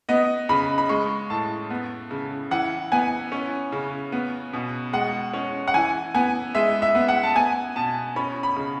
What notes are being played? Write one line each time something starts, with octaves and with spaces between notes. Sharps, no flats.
B3 D#5
C#3 B5
B5
G#3 C#6
A2 A5
B3
C#3
E3 F#5
B3 G#5
C#4
C#3
B3
B2
G#3 F#5
C#4
F#5
E3 G#5
B3 G#5
G#3 E5
E5
B3
F#5
A5
B3 G#5
B2 A5
C#4 B5
B5
C#3